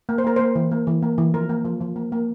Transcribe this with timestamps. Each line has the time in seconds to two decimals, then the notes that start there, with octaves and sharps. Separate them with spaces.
0.09 A#3
0.18 C5
0.24 A#3 A#4
0.36 A#3 C5
0.55 E3
0.71 A#3
0.87 E3
1.03 A#3
1.18 E3
1.34 F3 A#4
1.49 A#3
1.65 F3
1.81 F3
1.96 A#3
2.12 A#3